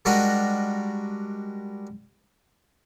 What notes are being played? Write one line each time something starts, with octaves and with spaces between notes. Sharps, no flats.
G3 G#3 D4 F#4 A#4 D#5